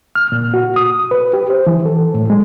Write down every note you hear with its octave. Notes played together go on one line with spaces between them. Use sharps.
F6
A#2
F#4
D#6
B4
G4
C5
E3
A4
A2
G#3